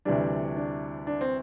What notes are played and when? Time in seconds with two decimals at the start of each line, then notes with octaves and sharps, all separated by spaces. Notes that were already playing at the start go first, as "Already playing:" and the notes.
0.05 D2 C3 E3 G3 D4
0.57 D4
1.07 D4
1.21 C4